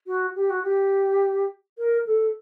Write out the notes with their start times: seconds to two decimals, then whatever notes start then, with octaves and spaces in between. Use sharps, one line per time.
0.07 F#4
0.36 G4
0.50 F#4
0.63 G4
1.78 A#4
2.07 A4